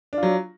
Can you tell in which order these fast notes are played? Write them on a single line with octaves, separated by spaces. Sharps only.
D4 F4 F#3